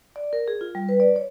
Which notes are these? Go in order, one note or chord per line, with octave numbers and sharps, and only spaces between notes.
D5
A#4
G#4
F4
G3
B4
D5
C#5